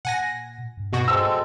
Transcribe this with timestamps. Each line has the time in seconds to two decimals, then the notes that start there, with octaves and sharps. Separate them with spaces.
0.05 A#2 F#5 G#5 A#6
0.77 G2
0.93 B2 F#4 A#6
1.08 G#3 C4 A4 E6